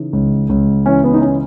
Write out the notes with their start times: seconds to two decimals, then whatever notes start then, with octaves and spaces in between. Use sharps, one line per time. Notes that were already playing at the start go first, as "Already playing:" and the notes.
Already playing: C#3 E3 D#4
0.13 C#2
0.49 C#2
0.86 E3 C#4
1.04 B3
1.14 D#4
1.21 C#4